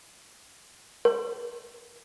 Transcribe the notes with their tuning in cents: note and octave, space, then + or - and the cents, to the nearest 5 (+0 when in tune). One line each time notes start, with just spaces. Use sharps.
A#4 +40